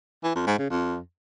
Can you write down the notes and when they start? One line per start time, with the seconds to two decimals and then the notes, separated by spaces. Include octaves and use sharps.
0.24 E3
0.35 F2
0.47 G#2
0.58 C#3
0.70 F2